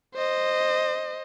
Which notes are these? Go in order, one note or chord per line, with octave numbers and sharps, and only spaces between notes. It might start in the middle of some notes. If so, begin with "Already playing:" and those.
C5 D#5